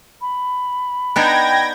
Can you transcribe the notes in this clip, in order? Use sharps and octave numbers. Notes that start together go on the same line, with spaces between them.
B5
B3 D4 D#4 G5 G#6 A#6